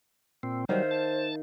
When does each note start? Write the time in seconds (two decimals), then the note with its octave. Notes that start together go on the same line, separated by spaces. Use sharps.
0.43 A#2 C4
0.69 D#3 F#3 G3 C5 E5 F5
0.91 A5